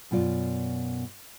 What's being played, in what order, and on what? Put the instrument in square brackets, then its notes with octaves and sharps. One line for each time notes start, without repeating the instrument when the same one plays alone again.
[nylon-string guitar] F#2 B2 F4 D5